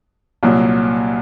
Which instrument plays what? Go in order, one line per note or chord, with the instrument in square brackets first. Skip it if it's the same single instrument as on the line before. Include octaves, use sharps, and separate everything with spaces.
[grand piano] C2 A#2 F#3